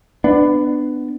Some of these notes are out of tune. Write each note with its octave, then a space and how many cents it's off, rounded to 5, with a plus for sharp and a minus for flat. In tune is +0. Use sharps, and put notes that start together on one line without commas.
B3 +15 D4 +15